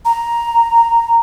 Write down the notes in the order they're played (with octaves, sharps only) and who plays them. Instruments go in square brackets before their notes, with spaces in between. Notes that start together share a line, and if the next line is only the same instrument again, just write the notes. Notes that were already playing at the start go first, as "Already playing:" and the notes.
[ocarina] A#5